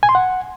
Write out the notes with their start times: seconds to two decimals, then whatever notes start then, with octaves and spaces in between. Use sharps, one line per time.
0.03 G#5
0.09 C6
0.15 F#5